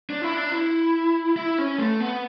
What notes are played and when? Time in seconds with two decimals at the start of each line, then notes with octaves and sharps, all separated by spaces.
0.10 D4
0.22 E4
0.35 D4
0.52 E4
1.36 E4
1.58 C#4
1.78 A3
2.00 B3